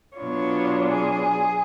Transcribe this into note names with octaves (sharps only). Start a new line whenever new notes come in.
B2 F#3 B3 D4 F4 C#5
G#4